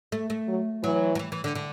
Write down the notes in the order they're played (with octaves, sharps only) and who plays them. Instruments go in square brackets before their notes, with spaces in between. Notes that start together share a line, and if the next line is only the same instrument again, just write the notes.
[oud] A3
A3
[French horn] F#3
[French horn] E3 [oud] F#3
[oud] F#3
E3
E3
D3
D3